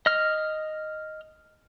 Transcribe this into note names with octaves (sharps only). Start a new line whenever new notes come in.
D#5 F6